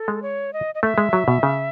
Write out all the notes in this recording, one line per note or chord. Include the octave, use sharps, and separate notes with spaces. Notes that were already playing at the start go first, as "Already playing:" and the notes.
Already playing: A4
G#3
C#5
D#5
D#5
A3 E5
G#3
F#3
B2
C#3